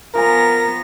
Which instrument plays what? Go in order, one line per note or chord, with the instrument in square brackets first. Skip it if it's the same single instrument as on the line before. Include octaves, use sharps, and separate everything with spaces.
[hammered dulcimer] F3 G#5 A#5 [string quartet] B3 A#6 [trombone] A#4